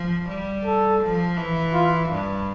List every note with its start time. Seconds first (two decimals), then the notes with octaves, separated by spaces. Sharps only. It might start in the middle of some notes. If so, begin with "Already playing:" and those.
Already playing: F3
0.29 G3
0.65 A4
1.02 F3
1.37 E3
1.73 F4
2.09 G2